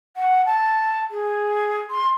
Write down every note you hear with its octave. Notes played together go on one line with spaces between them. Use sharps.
F#5
A5
G#4
C6